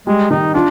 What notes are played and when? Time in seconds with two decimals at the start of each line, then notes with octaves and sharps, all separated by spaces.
0.07 G3 G#3
0.30 D#3 D#4
0.54 D4 F4